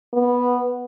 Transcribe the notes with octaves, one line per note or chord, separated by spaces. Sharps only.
B3